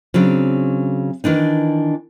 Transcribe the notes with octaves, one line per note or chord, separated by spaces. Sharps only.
C#3 F#3 C4 D4
D#3 E3 D4 D#4